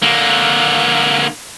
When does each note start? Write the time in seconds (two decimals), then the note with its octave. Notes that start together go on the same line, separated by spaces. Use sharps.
0.02 D3 A#3